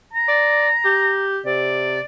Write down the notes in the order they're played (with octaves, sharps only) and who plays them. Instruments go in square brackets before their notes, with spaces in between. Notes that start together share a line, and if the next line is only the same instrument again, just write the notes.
[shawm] A#5
[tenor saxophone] D5
G4
[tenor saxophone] C3 [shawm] D5